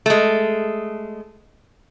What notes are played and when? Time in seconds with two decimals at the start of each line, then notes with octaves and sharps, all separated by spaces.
0.06 G#3 A3